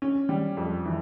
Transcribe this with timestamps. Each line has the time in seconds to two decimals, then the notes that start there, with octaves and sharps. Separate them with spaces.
0.02 C#4
0.29 G3
0.57 F2
0.85 E3